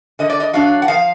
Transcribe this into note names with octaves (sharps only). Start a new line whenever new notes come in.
D3 D#5
D5
D#5
F#3 D4 F5
F#5
F3 F5